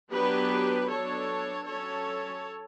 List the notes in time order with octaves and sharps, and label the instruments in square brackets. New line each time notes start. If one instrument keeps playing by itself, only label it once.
[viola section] F#3 B3 D4 G4 B4
F#3 B3 D4 A4 C#5
F#3 C#4 A4 C#5